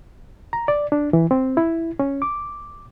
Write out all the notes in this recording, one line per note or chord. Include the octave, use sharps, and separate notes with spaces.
A#5
D5
D4
E3
C4
E4
C#4
D6